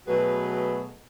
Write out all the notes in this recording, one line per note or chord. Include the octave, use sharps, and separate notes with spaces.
B2 F#3 A3 F#4 G#4 B4